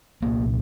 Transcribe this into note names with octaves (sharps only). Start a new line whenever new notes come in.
C2 A#2 A#3